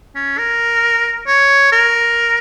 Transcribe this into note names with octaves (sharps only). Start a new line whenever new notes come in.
C#4
A#4
C#5
A#4